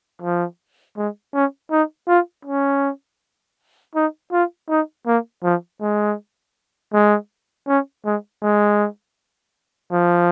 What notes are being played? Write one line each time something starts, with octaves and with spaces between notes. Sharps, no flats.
F3
G#3
C#4
D#4
F4
C#4
D#4
F4
D#4
A#3
F3
G#3
G#3
C#4
G#3
G#3
F3